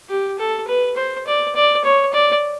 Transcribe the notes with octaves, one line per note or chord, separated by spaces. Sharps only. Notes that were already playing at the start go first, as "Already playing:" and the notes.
G4
A4
B4
C5
D5
D5
C#5
D5